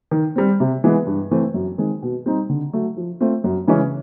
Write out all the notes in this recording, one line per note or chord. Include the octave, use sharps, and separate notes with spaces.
D#3
G3 C4
C3
E3 G#3 B3
G2
E3 A3 C4
F#2
D#3 G#3 C4
B2
G3 C4 D#4
D3
F#3 A3
F3
A3 C4 F4
F#2
C#3 E3 G#3 C#4